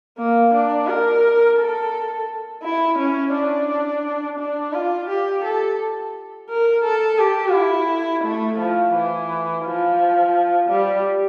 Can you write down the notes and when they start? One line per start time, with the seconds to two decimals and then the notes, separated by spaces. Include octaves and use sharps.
0.17 A#3
0.53 D4
0.88 A#4
1.59 A4
2.63 E4
2.98 C#4
3.33 D4
4.39 D4
4.73 F4
5.08 G4
5.44 A4
6.49 A#4
6.84 A4
7.19 G4
7.53 E4
8.24 A3
8.58 F3
8.94 E3
9.64 F3
10.69 G3